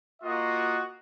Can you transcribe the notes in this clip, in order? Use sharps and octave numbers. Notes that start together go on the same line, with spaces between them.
A#3 F4 F#4 D#5